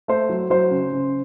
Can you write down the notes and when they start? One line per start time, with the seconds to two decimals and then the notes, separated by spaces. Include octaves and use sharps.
0.08 A3 C5
0.29 F#3
0.50 F#3 C5
0.71 C#3
0.92 C#3